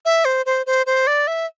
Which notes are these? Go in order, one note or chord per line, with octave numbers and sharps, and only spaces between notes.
E5
C5
C5
C5
C5
D5
E5